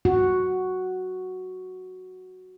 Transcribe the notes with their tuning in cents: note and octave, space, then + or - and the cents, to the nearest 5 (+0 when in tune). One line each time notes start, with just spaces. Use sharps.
F#4 +0